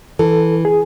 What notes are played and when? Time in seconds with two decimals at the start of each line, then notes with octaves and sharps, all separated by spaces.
0.19 E3 A4
0.65 G#4